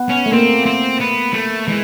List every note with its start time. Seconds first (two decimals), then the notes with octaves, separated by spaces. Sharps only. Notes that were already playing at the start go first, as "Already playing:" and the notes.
Already playing: B3
0.09 C#4
0.26 A3
0.32 A#3 C4
0.66 C4
1.00 B3
1.33 A3
1.68 E3 G#3